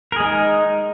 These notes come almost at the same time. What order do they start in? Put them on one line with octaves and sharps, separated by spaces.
A#4 G#4 G#3 D#4